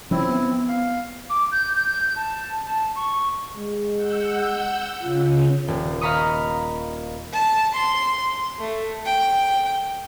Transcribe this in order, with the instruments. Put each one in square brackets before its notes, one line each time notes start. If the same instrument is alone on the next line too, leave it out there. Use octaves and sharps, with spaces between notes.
[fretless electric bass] F3 C#4 [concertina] C4 E4
[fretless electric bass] B3
[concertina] F5
[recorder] D6
G6
G6
G6
A5
A5
C#6
[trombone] G#3
[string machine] F#5 E6 G6
[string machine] C#3 C#4 [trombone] F4
[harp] D#1
D#5 F5 A#5 B5 C#6 D#6
[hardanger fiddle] A5
C6
A3
G5